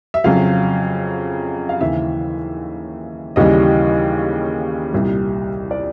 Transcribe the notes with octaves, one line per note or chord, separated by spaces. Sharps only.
E5
F2 C#3 F#3 F5
F5
D#2 C#3 E3 E5
D#2 C#3 E3 G3 D#5
C2 A#2 G3
D5